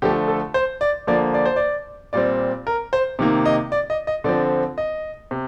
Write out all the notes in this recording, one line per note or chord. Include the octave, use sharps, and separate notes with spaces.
D3 F3 A3 G4
A4
C5
D5
D3 F3 A#3 D5
D5
C5
D5
A#2 G3 C4 D5
A#4
C5
C3 D#3 A#3
D#5
D5
D#5
D#5
D3 F3 C4 D5
D#5
C3